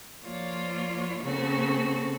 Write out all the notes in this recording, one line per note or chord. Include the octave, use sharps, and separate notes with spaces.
F3 A#3 F4 C#5 D5
C#3 A#3 C4 F#4 A4